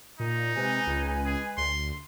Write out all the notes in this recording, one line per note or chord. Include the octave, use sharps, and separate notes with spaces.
A#2 D#4
C3 G#3 B4 G#5
C#2
G#4
D2 C6